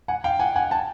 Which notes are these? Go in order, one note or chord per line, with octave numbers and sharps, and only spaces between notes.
F#5 G#5
F5 G5
F#5 G#5
F#5 G#5
G5 A5